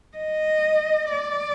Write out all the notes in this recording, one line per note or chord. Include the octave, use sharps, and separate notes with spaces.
D#5
D5